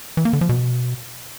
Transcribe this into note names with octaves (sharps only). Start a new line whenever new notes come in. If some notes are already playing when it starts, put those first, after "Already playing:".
E3
A#3
D3
F3
B2